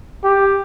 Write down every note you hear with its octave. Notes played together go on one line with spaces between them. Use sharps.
G4